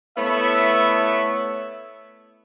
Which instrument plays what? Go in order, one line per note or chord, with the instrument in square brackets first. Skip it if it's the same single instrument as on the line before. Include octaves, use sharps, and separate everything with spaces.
[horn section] A3 B3 E4 C#5 E5